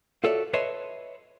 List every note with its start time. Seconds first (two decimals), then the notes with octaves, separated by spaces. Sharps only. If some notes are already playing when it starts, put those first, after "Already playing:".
0.24 F4 F#4 A4 C#5 D5 E5
0.54 B4 C#5 D#5 E5 A5 C6